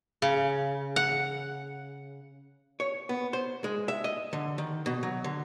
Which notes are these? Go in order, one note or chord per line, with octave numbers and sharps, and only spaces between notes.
C#3
F#5
C#5
B3
C5
G#3
E5
D#5
D3
D#3
B2
F#3
D3